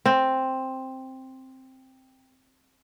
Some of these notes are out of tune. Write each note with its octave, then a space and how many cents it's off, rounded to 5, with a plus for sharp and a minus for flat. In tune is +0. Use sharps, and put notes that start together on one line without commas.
C4 +5